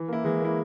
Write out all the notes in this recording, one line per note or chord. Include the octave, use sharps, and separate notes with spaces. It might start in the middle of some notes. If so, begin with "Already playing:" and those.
Already playing: E3
A#3 E4
E3 G#3
A#3 E4